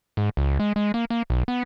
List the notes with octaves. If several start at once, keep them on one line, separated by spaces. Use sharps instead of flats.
G#2
C#2
G#3
G#3
A#3
A#3
B1
B3